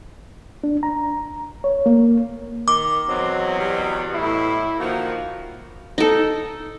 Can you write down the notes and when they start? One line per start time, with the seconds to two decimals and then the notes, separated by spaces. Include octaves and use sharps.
0.64 D4
0.83 A#5
1.64 C#5
1.86 A#3
2.68 D#3 D6
3.08 E2 B2 F#3 C4
3.59 G3
4.14 A2 E4
4.80 D#3 F3 A#3 F#4
5.98 D#4 A4